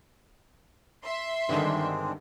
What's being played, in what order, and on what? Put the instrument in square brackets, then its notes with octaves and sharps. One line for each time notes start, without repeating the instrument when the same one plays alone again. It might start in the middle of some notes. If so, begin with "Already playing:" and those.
[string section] E5 C6
[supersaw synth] G2 D3 D#3 [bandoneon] G#3 C4 D4